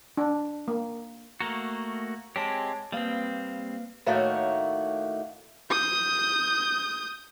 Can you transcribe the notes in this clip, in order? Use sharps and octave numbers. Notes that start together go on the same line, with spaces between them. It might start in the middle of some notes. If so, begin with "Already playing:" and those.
D4
A#3
A3 A#3 F#4 A#5
G#3 C4 G4 C#5 A5
G3 A#3 C4 B4 F5
A2 D#3 A3 A#3 F#4 C#5
D#6 G6